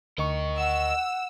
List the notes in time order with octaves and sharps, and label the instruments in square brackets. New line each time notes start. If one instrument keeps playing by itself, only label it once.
[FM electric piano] D2 C#6 [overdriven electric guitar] A#4 D#5
[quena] F#5 [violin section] E6